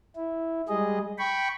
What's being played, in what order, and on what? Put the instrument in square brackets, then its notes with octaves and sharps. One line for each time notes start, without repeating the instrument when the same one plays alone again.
[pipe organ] E4
G3 G#3 G#4 D#5
G5 B5 C#6